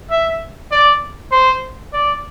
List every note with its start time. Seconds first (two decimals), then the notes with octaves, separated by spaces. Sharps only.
0.11 E5
0.72 D5
1.32 C5
1.93 D5